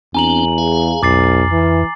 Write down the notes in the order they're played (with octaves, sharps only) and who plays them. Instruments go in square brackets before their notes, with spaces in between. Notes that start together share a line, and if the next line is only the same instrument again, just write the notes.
[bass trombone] E2 [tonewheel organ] C4 D4 [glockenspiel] G#5 A#5 F#7
[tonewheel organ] G#4 F5
[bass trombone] B1 [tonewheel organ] F2 [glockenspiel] D6 A6 C7
[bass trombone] E3